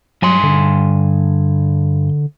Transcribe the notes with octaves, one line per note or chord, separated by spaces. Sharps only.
G2 F#3 G#5 C6
D3